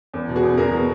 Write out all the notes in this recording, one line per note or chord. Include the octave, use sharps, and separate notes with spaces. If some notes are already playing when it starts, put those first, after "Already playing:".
E2
B2
F#4 G#4
E2
E2 G#4 A#4
B2